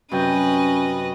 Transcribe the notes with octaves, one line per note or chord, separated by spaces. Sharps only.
F#2 C3 C#4 B4 D#5 G5